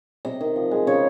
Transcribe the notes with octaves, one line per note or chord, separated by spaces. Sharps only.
C3 D#5
D#3
F3
G#3
C#3 C#5